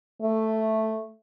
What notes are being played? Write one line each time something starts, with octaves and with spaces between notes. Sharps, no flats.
A3